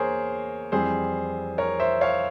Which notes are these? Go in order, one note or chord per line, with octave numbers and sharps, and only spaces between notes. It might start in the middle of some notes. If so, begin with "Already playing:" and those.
Already playing: E2 A#3 G#4 A#4 C5 C#5
F2 E3 G3 C4 E4 G#4 C5
A#4 C#5
C5 E5
C#5 F5